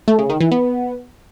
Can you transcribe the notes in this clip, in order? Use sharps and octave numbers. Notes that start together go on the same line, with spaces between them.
A3
C#3
D#3
E3
B3